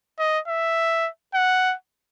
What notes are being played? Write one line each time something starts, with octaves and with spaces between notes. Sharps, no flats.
D#5
E5
F#5